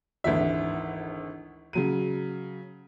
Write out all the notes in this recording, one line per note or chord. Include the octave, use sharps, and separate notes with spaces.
G#1 D2 E3 E5
C#3 F#3 D#7